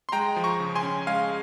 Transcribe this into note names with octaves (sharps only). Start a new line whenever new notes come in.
C6
G#3 G5 A#5
F3
A#5 C#6
C#3
G#5 C6
C#4
G#3 F5 G#5